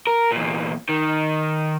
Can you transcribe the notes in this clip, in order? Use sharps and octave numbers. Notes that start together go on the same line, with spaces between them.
A#4
E2 A#2
D#3